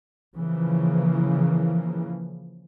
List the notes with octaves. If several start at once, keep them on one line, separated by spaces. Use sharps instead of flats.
C#3 E3 F3 A#3